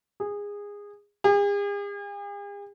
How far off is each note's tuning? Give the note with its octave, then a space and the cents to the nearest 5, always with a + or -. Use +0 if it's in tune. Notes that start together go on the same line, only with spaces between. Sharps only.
G#4 -20
G#4 -45